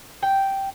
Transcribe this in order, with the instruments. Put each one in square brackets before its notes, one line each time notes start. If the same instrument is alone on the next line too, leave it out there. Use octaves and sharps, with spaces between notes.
[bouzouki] G5